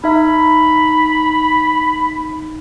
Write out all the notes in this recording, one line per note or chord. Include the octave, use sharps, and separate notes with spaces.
D#4 E5 B5